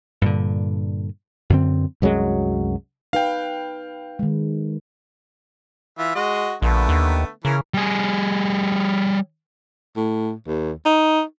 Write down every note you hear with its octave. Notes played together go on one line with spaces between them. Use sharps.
G2 A#2 D3
F#2 D3 C4
C2 F#2 F#3 G#3
D#4 B4 F5 G5
D#3 G#3
E3 F4 E5
G#3 F#4 D#5
A#1 D3 A3 B3
D#2
C#3 E3 A#4
G3 G#4
A2
D#2
D#4